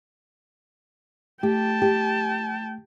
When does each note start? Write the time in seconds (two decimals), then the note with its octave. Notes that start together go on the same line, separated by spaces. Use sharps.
1.43 A3 G4 G5 A5
1.82 G4